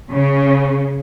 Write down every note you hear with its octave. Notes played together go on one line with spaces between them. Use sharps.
C#3